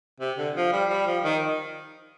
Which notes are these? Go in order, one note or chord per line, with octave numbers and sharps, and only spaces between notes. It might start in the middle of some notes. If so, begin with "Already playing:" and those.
C3
D3
F3
G3
G3
F3
D#3